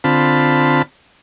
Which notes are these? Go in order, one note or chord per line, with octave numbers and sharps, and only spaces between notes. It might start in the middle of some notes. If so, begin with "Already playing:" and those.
D3 C4 F4 A5 B5